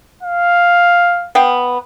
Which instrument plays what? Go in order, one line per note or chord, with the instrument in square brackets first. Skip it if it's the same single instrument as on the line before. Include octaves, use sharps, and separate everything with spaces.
[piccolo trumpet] F5
[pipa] B3 F5 G5